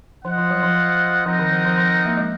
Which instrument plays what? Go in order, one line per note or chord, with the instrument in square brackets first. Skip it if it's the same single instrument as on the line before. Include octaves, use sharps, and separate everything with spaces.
[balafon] F3 [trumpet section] F4 C5 D#5 F#5
[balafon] F3
F#3
F3
[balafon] F3 [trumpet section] C4 D#4 A#4 D#5 F#5
[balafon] D#3
F3
F3
F3
A#3
G#3